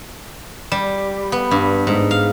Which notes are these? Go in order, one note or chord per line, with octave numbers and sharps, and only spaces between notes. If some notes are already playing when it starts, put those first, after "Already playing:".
G3
B3
G2
G#2
F5